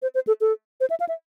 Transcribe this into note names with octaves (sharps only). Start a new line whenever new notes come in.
C5
C5
A4
A4
C5
E5
F5
E5